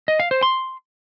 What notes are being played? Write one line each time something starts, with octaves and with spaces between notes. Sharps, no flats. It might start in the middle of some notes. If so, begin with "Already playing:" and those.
D#5
F5
C5
C6